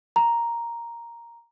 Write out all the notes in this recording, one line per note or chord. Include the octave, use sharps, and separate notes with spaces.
A#5